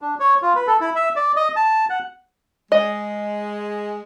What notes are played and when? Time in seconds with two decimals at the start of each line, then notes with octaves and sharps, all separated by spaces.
0.02 D4
0.20 C#5
0.42 F4
0.55 B4
0.67 A4
0.81 E4
0.96 E5
1.16 D5
1.36 D#5
1.56 A5
1.90 F#5
2.72 G#3 D#5